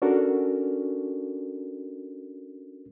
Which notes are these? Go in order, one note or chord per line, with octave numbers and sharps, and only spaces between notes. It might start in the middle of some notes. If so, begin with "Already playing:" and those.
C#4 D4 F#4 A4 A#4